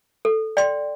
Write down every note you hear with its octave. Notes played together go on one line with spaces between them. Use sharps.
A4
D5 G5 C6